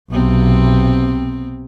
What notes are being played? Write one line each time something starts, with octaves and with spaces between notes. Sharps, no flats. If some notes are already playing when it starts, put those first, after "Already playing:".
B1 C3 B3 C4